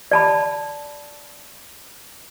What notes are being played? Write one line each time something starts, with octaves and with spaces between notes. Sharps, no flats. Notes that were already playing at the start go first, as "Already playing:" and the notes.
D5 A5 B5